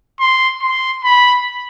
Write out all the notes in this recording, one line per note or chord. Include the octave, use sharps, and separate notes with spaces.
C6
C6
B5